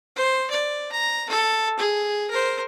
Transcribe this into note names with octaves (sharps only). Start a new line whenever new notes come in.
C5
D5
A#5
A4
G#4
A#4 C5